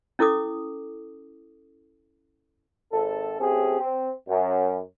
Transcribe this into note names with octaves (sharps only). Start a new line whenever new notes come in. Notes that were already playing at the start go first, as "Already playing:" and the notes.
C#4 E4 A4 D6 D#6
G#1 A4
A2 F3 C4 C#4 G4 G#4
C4
F#2